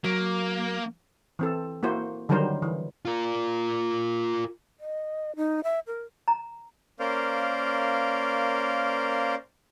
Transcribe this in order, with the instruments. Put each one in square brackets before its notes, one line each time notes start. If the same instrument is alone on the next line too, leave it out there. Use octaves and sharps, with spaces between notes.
[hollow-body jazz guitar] F#3 [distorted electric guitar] A#3
[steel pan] E3 C4 A4
A#3 E4 F#4 C5
D3 D#3 F#3 G3 A#4 C5
E3
[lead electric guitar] F4 A#4
[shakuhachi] D#5
D#4
E5
A#4
[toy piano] A#5
[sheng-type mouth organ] A#3 C#4 A#4 C5 D5 F5